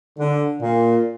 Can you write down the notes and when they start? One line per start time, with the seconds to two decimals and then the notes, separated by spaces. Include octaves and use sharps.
0.18 D3
0.61 A#2